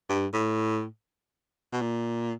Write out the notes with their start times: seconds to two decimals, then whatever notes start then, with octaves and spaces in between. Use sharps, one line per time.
0.10 G2
0.33 A2
1.73 B2
1.81 A#2